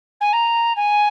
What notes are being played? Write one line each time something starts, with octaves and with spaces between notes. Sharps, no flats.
G#5
A#5
G#5